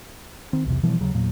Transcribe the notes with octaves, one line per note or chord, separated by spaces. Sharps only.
D#3 C4
B1 E2 C3
B2 E3 F3 G3
D#2 C#3 F#3
E2 A#2 F#3